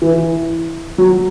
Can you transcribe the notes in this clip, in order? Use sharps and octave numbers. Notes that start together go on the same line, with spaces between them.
E3
F#3